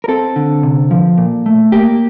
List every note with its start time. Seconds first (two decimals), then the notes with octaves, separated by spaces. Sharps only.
0.04 A#4
0.08 C4 A4
0.36 D3
0.63 C3
0.91 F3
1.18 A#2
1.46 A3
1.72 A#3 G4